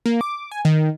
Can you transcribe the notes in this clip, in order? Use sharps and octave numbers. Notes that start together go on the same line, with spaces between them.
A#3
D6
G#5
D#3